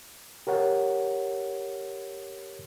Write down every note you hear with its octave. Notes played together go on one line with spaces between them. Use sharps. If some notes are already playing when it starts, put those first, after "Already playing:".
G4 A#4 C#5 F#5